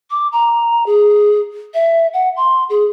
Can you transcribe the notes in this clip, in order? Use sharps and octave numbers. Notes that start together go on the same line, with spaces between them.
D6
A#5
G#4
E5
F#5
C6
G#4